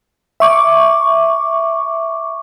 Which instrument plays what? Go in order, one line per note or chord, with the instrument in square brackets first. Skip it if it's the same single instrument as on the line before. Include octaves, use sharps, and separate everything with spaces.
[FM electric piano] E5 C#6 D6